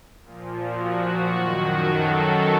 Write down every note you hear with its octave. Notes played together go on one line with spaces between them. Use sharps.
A#2 F3
F#4
F#2 D#3 F#3
A4